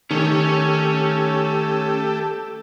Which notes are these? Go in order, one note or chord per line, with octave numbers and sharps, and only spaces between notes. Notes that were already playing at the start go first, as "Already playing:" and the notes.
D#3 A3 C#4 G4 A4 C#5